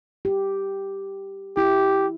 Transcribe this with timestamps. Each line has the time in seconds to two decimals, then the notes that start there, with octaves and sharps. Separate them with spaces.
0.25 G4
1.57 E4 G4